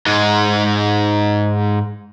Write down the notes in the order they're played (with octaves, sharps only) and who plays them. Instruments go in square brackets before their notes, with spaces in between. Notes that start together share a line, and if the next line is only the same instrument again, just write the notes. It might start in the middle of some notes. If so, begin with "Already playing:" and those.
[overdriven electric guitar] G#2 G#3